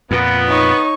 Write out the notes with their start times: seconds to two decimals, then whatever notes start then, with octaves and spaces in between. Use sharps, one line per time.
0.11 F2 A#2 B3
0.48 D#4 C#5 C#6